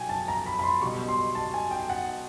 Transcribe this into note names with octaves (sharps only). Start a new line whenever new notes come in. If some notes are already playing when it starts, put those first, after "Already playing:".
Already playing: B2 F#3 G5 G#5
A5
A#5
B5
B5
C6
B1 B2 G3 C#6
C6
A5
G#5
G5
F#5